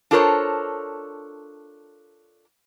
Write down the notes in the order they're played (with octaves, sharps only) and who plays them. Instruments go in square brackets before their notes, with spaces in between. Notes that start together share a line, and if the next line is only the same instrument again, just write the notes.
[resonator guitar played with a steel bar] D4 F4 A4 A#4 C5 C#5